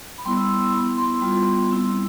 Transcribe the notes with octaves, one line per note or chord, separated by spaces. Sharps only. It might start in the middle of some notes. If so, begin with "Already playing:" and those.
B5
G3 B3 E4 C6
E6
E6
B3 E4
C6
G3 B3 F4
G3 C4 E4